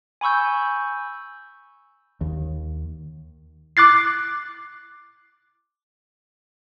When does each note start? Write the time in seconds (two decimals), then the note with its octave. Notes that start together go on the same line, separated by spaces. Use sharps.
0.21 G#5 B5 C#6 E6 G6
2.21 D#2
3.77 D6 F#6 A6 C7